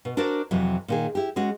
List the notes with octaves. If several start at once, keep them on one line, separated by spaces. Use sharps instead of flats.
B2
D4 F#4 A#4 C5 D5
F2 C3 E3 F#3
A#2 D#3 G#4
E4 G4
G#3 C#4 F#4